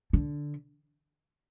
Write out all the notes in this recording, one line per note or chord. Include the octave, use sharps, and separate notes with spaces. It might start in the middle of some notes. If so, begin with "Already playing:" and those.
D3